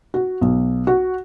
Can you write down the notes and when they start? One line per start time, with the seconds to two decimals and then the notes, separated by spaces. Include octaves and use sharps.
0.14 F#4
0.41 B1
0.87 F#4